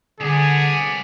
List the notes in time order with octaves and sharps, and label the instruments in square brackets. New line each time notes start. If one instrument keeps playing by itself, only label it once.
[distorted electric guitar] C2 B3 [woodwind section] D3 [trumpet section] D4 D5 G#5 [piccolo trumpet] G#4